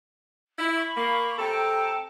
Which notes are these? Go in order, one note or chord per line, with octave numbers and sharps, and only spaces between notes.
E4
B5 C#6
A#3
C3 A3 A4 G5 A#5